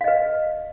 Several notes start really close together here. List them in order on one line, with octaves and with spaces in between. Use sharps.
F5 D#5 B4